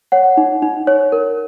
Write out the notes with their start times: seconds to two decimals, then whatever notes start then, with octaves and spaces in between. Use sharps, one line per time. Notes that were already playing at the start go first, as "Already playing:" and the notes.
0.12 C#5 F#5
0.37 D#4
0.62 D#4
0.87 C#5
1.12 A#4